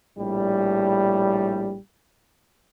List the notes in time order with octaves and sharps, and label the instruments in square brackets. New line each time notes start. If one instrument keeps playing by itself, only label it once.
[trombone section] A#1 A2 G3